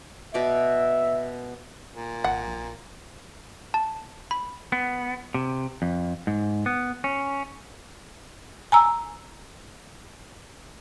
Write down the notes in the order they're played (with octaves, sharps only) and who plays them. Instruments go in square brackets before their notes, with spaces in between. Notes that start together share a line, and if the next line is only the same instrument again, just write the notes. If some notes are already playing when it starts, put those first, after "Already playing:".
[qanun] B2 D5 D6 [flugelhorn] E5
[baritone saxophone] A#2
[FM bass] G#1 [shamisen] F#5
[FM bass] A#1
[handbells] A5
B5
[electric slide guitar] B3
C3
F2
G#2
B3
C#4
[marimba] G#5 A#5 E6